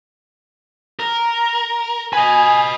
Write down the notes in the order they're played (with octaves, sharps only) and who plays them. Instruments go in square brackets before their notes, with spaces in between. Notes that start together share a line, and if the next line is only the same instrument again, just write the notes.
[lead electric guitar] A#4
[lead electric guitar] B4 D#5 [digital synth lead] G#5